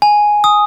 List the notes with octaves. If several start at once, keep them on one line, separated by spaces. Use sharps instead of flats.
G#5
D#6